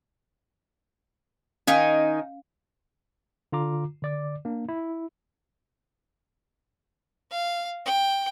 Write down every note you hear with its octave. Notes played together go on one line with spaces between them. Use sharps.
D#3 C#4 D#4 F5 G#5
D3 F4 A#5 D6
D3 D5 D6
A#3 D4
E4
F5
G5